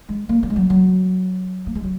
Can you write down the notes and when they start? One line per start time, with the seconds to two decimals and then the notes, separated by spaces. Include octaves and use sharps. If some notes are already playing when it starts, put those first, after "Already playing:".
0.09 G#3
0.29 A#3
0.43 A#3
0.50 G#3
0.56 F#3
0.70 F#3
1.67 A#3
1.75 G#3
1.84 F#3